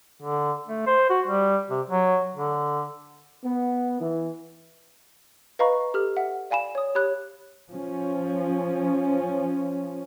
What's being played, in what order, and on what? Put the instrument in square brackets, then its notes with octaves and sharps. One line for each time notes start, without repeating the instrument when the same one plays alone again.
[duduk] D3
A3
C5
F#4
G3
C3
F#3
D3
[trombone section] B3
E3
[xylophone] B4 D#5 F5 A#5 B5 C#6
G4 A4 F6
E5 F#5
D5 F5 G#5 B5 E7
C#5 D#6
G4 C#5 B5 F#6
[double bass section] F3 C#4